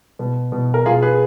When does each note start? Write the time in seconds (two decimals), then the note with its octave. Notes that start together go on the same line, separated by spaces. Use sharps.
0.19 B2
0.52 B2
0.74 A#4
0.86 B2 F4 G#4
1.02 G#4 B4